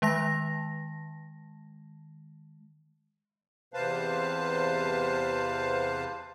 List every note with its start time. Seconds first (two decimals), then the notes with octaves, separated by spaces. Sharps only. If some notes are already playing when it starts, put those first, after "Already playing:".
0.02 D#3 G#3 A5 A#6
3.74 E2 C3 B4 C5 F5 A5